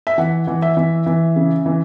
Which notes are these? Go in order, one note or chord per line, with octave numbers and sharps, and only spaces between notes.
E5
E3 F#5
E3
E5
E3
E3
C#3
E3